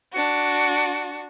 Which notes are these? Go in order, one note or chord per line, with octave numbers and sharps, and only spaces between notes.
D4 F#4